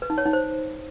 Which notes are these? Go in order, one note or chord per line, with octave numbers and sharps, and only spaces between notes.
B4
D#4
C#5
D#4
C5